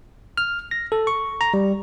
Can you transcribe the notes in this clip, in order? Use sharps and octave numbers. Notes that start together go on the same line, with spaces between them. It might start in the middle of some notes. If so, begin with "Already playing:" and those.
F6
A#6
A4
C#6
A#5
G3